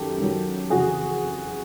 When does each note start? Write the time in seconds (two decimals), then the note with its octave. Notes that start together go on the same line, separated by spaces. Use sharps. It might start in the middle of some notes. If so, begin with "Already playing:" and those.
Already playing: F#2 D#3 F#3 G4 A4
0.18 F#2 D#3 F#3
0.70 F2 C#3 E3 F#4 G#4